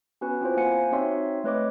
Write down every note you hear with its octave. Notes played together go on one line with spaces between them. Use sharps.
B3 C#4 F#4 B4 G#5
C4 E4 F4 C5
A#3 F#5 G#5 C#7
C4 D#4 F#4 C#5 E5 C6
A3 C4 B4 C#5 D#5 D6